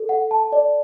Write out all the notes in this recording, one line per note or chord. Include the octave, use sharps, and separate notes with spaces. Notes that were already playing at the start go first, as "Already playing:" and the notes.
Already playing: A4
F#5
A5
D5